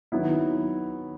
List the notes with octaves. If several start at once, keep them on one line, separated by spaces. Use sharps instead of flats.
D#3 F#3 B3 E4